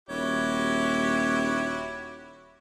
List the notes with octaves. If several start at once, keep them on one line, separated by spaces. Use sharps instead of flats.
D#1 E4 F#4 G4 C#5